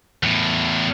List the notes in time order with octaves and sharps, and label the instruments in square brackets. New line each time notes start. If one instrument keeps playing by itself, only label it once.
[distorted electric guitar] E2 A2